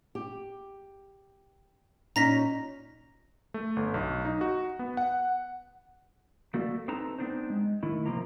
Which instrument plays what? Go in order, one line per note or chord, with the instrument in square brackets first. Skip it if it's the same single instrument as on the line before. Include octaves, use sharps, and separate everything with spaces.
[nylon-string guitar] G4
[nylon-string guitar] A#2 C#4 D#4 [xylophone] A#5 A#6 B6
[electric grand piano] A3
G1
B1
D#4
F#4
B3
F#5
[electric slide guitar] A3 A#3 F#4 A4 D5
C4 D#4 A4 B4 A5 A#5
B3 C4 D4 D#4 C5
G#3
D#3 A3 E4
C3 F3 A#3 A#5